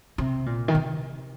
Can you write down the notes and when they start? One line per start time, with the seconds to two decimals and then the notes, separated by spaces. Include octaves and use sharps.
0.18 C3
0.46 A#2
0.68 D#3
0.75 C3